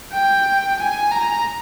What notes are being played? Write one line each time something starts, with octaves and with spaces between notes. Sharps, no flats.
G5
G#5
A#5